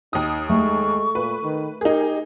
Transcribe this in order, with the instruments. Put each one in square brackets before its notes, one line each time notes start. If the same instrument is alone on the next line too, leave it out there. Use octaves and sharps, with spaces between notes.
[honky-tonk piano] D#2 D#6 [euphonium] D#4
[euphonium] G#3 [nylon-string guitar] A3 [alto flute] C#6
[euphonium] A#2 [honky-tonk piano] B4
[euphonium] D#3
[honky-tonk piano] D#4 G#4 [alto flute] G4 [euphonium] A#4